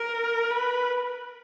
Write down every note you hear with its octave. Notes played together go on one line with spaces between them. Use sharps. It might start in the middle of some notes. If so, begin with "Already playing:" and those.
Already playing: A#4
B4